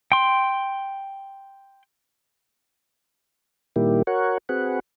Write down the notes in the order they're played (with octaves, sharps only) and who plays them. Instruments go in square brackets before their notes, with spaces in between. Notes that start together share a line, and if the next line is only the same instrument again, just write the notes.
[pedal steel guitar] G5 C6
[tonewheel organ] A#2 D#3 G3 A#3 E4 G4
F#4 A#4 C#5 F#5
C4 F#4 G#4 B4 F#5